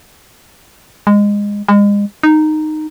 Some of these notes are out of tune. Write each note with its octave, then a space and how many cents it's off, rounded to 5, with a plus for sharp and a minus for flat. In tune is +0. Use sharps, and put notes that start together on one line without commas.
G#3 -20
G#3 -35
D#4 -10